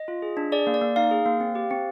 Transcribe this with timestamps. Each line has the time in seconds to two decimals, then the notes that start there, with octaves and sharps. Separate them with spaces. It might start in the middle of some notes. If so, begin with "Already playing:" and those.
Already playing: D#5
0.08 F4
0.22 G#4
0.37 D4
0.52 G#4 D5
0.67 A#3
0.74 D5
0.82 A#3
0.96 D#4 F5
1.11 G#4
1.26 A#3
1.40 C4
1.55 G4
1.71 C4